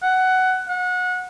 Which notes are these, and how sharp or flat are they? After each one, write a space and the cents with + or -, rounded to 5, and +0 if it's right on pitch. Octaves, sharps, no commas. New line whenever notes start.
F#5 +15
F#5 -25